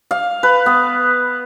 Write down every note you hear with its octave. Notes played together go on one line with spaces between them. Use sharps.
F5
B4
B3